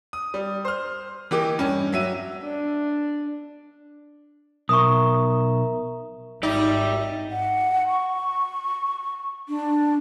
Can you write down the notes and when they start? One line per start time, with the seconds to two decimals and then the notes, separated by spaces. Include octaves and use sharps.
0.13 D#6
0.34 G3
0.65 C5 F6
1.31 E3 A#3 G4 D#5 D6
1.59 G2 C#4
1.92 F#3 E5 D#7
2.42 D4
4.69 B1 A#4 E5 A#5 C#6 D#6
6.43 G#1 D#4 G4 D5 E5
7.31 F#5
7.88 C#6
9.49 D4